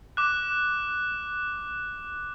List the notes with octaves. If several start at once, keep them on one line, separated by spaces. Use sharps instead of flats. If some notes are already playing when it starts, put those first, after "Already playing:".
D6 F#6